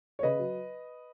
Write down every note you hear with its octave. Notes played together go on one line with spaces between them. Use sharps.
C#5
C#3 B4 D#5
F#3